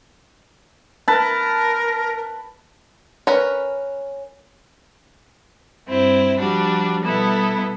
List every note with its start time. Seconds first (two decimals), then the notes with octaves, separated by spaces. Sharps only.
1.08 A#4 B4 A5
3.27 C#4 A#4 B4
5.88 G2 C4 E4
6.38 F3 G3 D4 F#4
7.05 B2 G3 B3 E4 A4